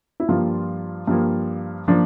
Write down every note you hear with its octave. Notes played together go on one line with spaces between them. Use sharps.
E4
G2 F3 A#3 F4
G2 F3 A#3
F3 A#3 D4